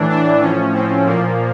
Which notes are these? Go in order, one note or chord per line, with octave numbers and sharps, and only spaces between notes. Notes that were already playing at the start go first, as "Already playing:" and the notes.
Already playing: A2 E3 D4
D4
A2 F3 C#4
C4
A#2 F3 A#3